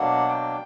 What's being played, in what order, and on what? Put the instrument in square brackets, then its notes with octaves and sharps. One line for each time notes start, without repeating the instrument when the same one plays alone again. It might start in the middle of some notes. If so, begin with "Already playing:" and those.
Already playing: [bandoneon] B2 F#3 A#3 D4 F#5
G5